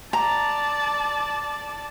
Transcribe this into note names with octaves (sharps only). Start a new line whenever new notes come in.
D5 A5 A#5